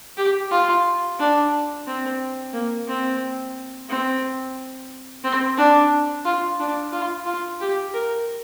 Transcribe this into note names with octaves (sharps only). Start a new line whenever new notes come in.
G4
F4
D4
C4
A#3
C4
C4
C4
D4
F4
D4
F4
F4
G4
A#4